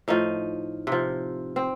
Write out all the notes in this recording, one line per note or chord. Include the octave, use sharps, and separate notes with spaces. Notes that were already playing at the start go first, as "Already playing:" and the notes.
A2 F3 D#4
C3 F3
C4